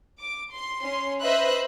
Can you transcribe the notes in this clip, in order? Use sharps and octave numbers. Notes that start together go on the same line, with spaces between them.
D6
C6
C#4 C6
B4 C5 D#5 E5 B5 F#6